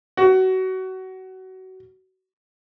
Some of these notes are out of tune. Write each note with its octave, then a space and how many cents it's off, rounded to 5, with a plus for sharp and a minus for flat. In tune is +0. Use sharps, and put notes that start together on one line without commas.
F#4 +25